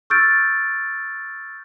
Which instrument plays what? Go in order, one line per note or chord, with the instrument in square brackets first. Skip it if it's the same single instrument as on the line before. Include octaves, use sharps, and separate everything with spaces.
[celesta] C#6 E6 F6 G6 A6 D7